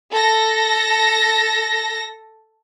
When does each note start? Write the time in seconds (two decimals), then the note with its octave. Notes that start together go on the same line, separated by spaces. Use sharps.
0.11 A4 A#6